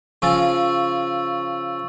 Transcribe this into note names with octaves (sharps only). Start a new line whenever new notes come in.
C#3 F3 C#4 C#6 E6 A6